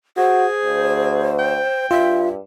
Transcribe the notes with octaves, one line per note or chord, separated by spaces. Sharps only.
F#4 G#4 C5
D2
G5
G2 F4 E5